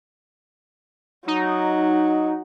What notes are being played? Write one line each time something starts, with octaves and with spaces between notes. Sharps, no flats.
F#3 D#4